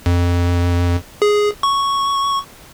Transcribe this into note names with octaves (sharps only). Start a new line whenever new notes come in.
F2
G#4
C#6